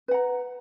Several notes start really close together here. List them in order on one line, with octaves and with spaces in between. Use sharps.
B4 F#5 A#5